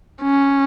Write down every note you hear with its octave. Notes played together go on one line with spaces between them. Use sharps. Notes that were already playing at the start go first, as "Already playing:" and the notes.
C#4